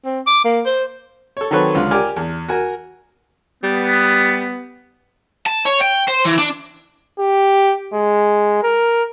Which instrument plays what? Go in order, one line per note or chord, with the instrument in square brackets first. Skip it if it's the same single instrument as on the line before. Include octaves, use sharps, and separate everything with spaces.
[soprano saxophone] C4
D6
A#3
C5
[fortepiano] A4 C#5
D#3 F#3 C4 A4 B4 C#5
C#2 D3 F4
G4 A#4 D5 G#5 F6
E2
F#4 A#4 G#5
[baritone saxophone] G3 [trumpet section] B3
[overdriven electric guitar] A5
C#5
G5
C5
E3
D4
[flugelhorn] G4
G#3
A#4